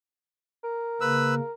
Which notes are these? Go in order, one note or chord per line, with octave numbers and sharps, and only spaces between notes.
A#4
C#3 A#3 B4 E6